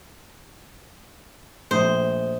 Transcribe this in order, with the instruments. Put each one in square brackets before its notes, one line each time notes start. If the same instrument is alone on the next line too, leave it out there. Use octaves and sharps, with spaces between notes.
[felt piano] A#1 A3 D#6 [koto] C5